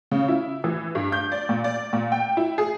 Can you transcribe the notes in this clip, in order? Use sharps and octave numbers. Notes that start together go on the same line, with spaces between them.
C#3
E4
E3
G2
G6
D5
A#2
D5
A#2
G5
E4
G#4